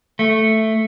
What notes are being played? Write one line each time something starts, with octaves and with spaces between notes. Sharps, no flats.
A3